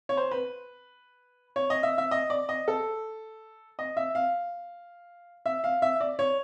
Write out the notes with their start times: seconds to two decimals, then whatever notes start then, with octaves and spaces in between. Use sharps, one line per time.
0.09 C#5
0.17 C5
0.31 B4
1.56 C#5
1.70 D#5
1.83 E5
1.98 E5
2.11 D#5
2.30 D5
2.49 D#5
2.68 A4
3.79 D#5
3.97 E5
4.15 F5
5.46 E5
5.64 F5
5.82 E5
6.00 D5
6.19 C#5